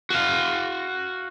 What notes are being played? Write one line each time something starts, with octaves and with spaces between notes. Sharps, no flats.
F#4 F5